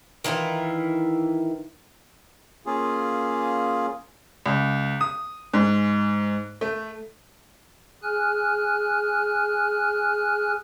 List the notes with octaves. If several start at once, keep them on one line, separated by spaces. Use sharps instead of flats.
D#3 E3 E4 F4
A#3 C#4 F4 G#4
C#2
D#6
G#2
A3
G#4 G#5 F6 F#6